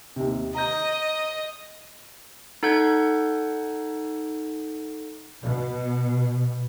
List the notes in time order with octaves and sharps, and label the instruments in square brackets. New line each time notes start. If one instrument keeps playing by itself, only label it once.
[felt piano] D#2 C3
[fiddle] D#5 [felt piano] A#5 G6
[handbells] D#4 A4 F#5 G6 G#6
[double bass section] B2